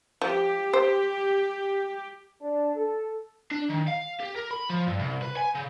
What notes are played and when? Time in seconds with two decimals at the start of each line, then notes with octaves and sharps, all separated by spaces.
0.22 F3 G4
0.73 C5
2.42 D4
2.75 A4
3.51 D4
3.69 D#3
3.87 F5
4.20 G4
4.36 A#4
4.51 B5
4.70 F3
4.87 G2
4.99 C2
5.22 B4
5.37 G#5
5.55 C#3